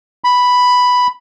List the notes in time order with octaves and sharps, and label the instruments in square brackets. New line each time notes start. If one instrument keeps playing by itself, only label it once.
[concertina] B5